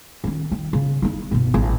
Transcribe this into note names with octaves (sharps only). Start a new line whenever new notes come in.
D#3 C#4
D#3
C#3
D#4 E4
G1 B2
A1 D#4